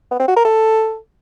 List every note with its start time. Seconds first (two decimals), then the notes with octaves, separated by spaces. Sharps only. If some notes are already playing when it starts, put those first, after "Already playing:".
0.11 B3
0.20 C4
0.28 F#4
0.37 A#4
0.45 A4